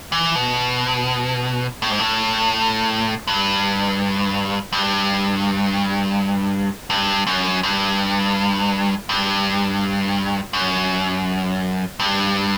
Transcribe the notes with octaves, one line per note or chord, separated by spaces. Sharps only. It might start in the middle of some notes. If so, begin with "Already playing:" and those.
E3
B2
A2
G#2
A2
G2
G2
G2
F#2
G2
G2
F#2
G2